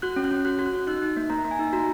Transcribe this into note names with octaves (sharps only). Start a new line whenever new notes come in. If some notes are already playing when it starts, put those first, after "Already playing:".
F#4 F#6
C#4
F#6
C#4
F#4 F#6
F#4
F#6
F#4
D#4 F#6
D#4
A#3
A#3 A#5
A#3
G#5
D#4
F#4 A#5